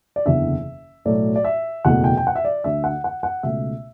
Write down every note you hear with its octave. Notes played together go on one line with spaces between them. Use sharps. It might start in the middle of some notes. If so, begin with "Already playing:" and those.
D5
F#1 E2 D3 E5
B1 A2 F#3 A3 D5
D5
E5
F#1 E2 B2 A3 F#5
G5
G5
F#5
E5
D5
D2 D3 A3 E5
F#5
F#5
F#5
C#2 B2 A3 E5